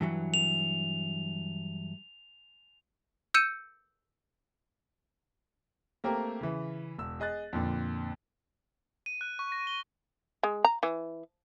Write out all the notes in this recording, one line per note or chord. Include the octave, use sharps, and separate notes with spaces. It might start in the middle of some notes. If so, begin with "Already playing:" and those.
G2 E3 F#3
F7
E6 G6 C#7 D#7 E7
A3 A#3 C4 G4 A#4
C#3 E3
E1 E6
G#4 D#5 F#6 A6
F2 A#2 D3
D#7
F#6
C#6
A#6
G7
G#3
A#5
E3